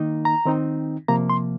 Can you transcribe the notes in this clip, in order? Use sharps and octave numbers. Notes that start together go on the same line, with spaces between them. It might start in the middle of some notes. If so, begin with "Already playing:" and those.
Already playing: D#3 A#3 D#4
A#5
D#3 C4 D#4
C3 F3 A#3 A#5
C6